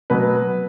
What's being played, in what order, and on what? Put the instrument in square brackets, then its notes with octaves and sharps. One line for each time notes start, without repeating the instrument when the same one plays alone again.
[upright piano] B2 F#3 B3 B4